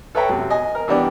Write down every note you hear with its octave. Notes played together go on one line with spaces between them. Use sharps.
A4 B4 C#5 E5 G5 A#5
F#2 C3
D#5 G#5
A#4
E3 G3 B3 D4 G4